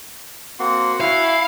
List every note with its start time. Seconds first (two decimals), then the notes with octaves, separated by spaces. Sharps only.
0.59 A#3 C4 F#4 F#5 C6
1.01 C#4 E4 F5